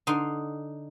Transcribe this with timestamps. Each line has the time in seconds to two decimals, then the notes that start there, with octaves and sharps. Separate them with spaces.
0.07 D3 D#4 C6